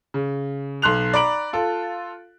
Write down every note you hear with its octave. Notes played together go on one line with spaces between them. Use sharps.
C#3
B1 C6 F#6 F7
D5 A#5 B5 D7 F#7
F4 A4